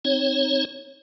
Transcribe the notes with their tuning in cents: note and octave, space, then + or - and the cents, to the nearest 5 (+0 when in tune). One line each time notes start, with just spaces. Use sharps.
C4 +0 D#4 +0 C#5 -15